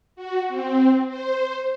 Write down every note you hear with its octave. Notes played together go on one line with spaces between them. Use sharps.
F#4
C4
C5